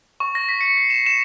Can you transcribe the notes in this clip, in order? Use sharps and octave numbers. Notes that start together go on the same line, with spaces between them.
C#6
A#6
B6
C#7
C7
E7
E7